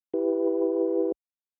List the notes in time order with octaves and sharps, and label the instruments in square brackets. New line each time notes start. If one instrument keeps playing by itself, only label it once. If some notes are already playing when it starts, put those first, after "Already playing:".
[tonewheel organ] E4 G4 B4